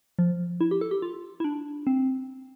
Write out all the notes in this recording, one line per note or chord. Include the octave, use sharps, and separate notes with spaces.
F3
E4
G4
A4
G4
F4
E4
D4
C4